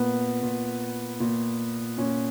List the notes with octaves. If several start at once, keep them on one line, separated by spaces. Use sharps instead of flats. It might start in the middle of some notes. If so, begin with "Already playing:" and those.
Already playing: A#2 B3
A#2
A#2
A#2 C#4